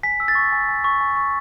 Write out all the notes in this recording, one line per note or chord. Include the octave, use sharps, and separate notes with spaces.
G#5 B6
E6
A6
C#6
G#5
G#5
C#6
G#5
C#6